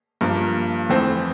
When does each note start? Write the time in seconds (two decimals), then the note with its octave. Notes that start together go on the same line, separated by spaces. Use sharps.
0.21 G2 F3 A#3
0.89 F2 E3 A3 C4